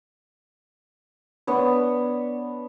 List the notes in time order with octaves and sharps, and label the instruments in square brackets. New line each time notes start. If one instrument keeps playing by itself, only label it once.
[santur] B3 D4 C#5